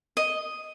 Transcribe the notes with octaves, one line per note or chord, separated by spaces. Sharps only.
D#5